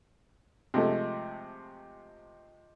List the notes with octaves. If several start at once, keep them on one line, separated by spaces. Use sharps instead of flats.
C3 F3 G#3 A3